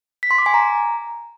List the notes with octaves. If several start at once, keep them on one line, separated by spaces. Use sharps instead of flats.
B6
C6
D6
G#5
A#5